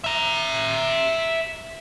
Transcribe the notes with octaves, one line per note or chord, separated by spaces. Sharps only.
E5 A#5